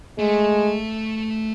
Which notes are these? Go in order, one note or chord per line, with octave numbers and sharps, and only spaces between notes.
G#3 A3